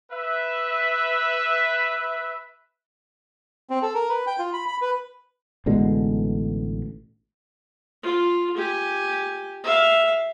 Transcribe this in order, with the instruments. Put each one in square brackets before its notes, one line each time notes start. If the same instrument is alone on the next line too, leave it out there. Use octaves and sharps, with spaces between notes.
[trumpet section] B4 E5
[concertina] C4
A4
A#4
B4
G5
F4
B5
B5
B4
[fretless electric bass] A1 B2 D3 G#3
[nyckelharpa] F4
G4 G#5
E5 F5